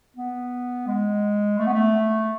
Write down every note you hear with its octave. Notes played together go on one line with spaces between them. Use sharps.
B3
G#3
A3
B3
A3